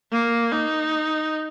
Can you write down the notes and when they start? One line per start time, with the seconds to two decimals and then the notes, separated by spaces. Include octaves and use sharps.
0.12 A#3
0.52 D#4